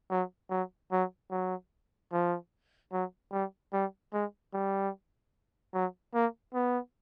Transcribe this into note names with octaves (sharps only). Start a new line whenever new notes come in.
F#3
F#3
F#3
F#3
F3
F#3
G3
G3
G#3
G3
F#3
A#3
B3